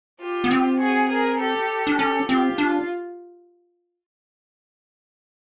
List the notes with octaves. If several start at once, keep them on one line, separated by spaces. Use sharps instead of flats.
F4 G4
B3
C4
F#4 G#4
G#4 A#4
G4 A4
D4
C#4 G4 A4
C4 F4 G4
D4 F4